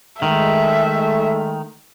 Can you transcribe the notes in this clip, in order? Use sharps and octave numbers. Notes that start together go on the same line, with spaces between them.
D#3 G#3 A3 E5